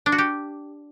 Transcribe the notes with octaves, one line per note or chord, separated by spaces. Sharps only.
D4
F#4
G4